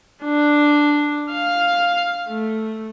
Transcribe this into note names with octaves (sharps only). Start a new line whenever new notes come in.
D4
F5
A3